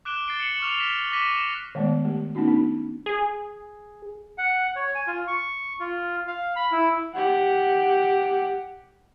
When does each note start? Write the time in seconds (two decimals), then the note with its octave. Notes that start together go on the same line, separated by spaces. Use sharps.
0.05 D6 F#6 D7 E7 G7
0.27 A6 C7 D7 G7
0.40 C#7 F#7
0.59 C#6 D6 F6 F7
0.78 B6 E7
1.12 D6 A#6 B6 D#7
1.75 D#3 G#3 A3 B3 D5
2.05 A3 G4
2.35 A3 B3 C#4 D#4 F#4
2.48 D4
3.06 G#4
4.38 F#5
4.76 C#5
4.95 G#5
5.07 F4
5.27 C#6
5.80 F4
6.28 F5
6.56 B5
6.72 E4
7.14 G4 F#5